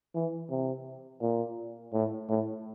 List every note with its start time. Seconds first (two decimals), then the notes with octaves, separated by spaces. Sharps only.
0.15 E3
0.50 C3
1.21 A#2
1.93 A2
2.29 A2